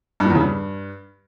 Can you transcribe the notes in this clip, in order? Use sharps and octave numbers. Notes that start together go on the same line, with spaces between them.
G2
A#2
E2
C#3
G2